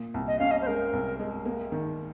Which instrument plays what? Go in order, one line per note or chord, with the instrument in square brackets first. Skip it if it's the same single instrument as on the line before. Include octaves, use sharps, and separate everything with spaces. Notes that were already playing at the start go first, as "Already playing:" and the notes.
Already playing: [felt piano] A#2
C2
[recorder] D#5
[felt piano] C#4 [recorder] F5
[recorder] D#5
C5
[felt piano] G#3 [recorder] A#4
[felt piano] C2
G#3
A#3
D#3